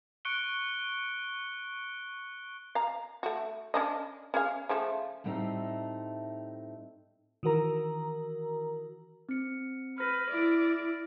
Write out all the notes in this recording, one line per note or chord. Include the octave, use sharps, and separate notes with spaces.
C#6 F#6 C#7 D7 G7
F5 A#5
A3 F#4
C#4 D4 D#5
C#4 G#4 F5
C#3 F3 A3
A2 G3 A3 B3 C4 D#4
D#3 E3 F#4 A#4 A#5
C4 C#7
B4 F6 A#6
E4 D5